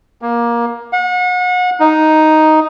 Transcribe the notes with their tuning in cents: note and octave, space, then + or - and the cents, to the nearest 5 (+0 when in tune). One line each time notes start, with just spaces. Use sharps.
A#3 +15
F#5 -35
D#4 +0